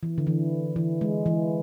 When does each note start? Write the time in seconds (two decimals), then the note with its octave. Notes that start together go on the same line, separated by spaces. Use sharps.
0.03 E3
0.18 D3
0.27 E3
0.76 E3
1.01 G#3
1.26 E3